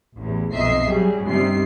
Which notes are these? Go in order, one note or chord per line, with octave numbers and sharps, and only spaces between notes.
A1 E2
B1 F2 D#5 E5 C7
F#3 G3 G#4
G1 C3 G3 D#4 C7